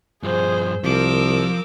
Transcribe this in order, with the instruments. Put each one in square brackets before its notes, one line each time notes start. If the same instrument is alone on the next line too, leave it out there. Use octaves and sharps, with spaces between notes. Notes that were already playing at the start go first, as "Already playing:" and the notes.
[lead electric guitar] G2 F3 [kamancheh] G#4 C5
[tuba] C2 [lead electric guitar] F3 [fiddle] A#4 D6 [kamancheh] E6